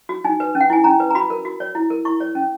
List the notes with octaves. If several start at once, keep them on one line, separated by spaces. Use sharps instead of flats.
F#4
D#4 G#5
B4
C#4
F#5
E4 G#5
C#4 A#5
B4
A#5
F#4 B5
A#4
F#4
C#5
E4
A#4
E4 C#6
C#5
C#4